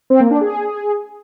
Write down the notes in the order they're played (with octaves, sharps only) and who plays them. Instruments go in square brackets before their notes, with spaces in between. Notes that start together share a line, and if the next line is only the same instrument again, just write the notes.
[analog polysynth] C4
A#3
D4
G#4